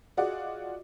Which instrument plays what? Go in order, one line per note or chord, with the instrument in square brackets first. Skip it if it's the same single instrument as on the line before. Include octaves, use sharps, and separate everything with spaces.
[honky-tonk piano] F4 F#4 G#4 D5 D#5 F#5